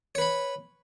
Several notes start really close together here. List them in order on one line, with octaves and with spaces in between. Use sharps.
C#5 B4 B5